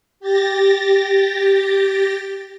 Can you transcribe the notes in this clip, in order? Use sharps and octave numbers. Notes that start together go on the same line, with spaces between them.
G4 A6 A#6